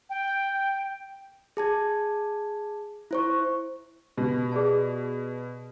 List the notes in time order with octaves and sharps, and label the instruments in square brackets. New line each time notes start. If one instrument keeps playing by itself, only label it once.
[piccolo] G5
[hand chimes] G#4 A5 G#6
E4 C5 C#6
[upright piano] B2 [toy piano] G4
[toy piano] G#4 D5 A5